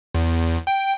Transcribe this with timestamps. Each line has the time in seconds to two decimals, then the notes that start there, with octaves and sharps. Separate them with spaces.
0.15 E2
0.67 G5